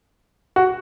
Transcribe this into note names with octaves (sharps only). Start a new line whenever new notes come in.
F#4